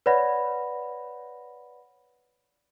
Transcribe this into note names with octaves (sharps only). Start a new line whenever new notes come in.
B4 C#5 D5 F#5 B5 A#6